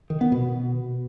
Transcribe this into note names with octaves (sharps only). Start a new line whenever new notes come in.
D#3
B3
B2